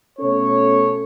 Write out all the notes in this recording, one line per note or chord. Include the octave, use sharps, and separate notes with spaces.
B2 A3 C#4 A4 C#5